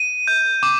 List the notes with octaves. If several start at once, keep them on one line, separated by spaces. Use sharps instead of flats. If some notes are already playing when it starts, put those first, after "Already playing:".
Already playing: D#7
G6
D6